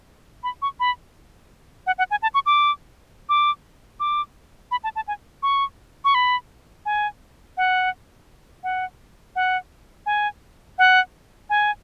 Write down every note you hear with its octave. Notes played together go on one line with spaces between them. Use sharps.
B5
C#6
B5
F#5
F#5
G#5
A5
C#6
D6
D6
D6
B5
A5
A5
G#5
C#6
C#6
B5
G#5
F#5
F#5
F#5
G#5
F#5
G#5